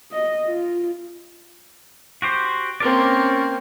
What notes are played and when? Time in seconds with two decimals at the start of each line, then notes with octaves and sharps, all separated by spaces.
0.12 D#5
0.45 F4
2.22 F#4 G4 C5
2.80 A#3 C4 C#4 A#4 D5